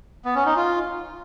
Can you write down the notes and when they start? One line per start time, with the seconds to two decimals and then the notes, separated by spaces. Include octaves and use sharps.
0.25 B3
0.35 C#4
0.46 D#4
0.56 F4